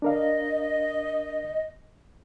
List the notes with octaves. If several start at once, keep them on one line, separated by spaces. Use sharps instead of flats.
D4 A#4 D#5 F5